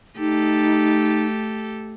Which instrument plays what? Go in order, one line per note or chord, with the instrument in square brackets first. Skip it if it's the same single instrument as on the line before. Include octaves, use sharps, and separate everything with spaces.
[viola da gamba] A3 G4 A4 [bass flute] D#4